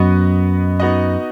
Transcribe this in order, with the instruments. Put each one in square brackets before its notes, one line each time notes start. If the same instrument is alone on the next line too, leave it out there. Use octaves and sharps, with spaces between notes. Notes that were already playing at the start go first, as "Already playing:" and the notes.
Already playing: [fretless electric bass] F#2 [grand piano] B3 F#4 B4 D#5
[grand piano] B3 D#4 F#4 D#5